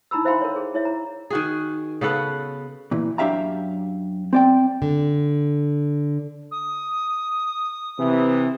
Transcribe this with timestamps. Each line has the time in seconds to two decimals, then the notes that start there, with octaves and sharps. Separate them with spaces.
0.11 D#4 E4 A#5 B5 E6
0.25 C5 E5 F5 G5 B5 C6
0.41 A#4 C#5
0.56 G#4
0.74 E4 C#5 E5
0.85 A#5
1.30 D#3 F#4 G#4
2.01 C#3 B3 A4 F#5
2.91 A#2 E3
3.18 F#2 D4 G4 E5 F5 A#5
4.33 C4 D5 G5
4.82 D3
6.51 D#6
7.99 C3 E3